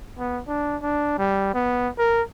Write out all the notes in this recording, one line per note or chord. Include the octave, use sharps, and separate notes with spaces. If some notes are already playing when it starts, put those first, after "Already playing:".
B3
D4
D4
G3
B3
A#4